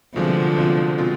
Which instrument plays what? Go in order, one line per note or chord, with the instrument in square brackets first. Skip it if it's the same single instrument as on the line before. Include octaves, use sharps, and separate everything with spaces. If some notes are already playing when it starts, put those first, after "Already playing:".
[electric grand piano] C2 B2 G#3 C4 F4 [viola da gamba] D3 F3
[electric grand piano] C2 B2 G#3 C4 F4
B2 G#3 C4 F4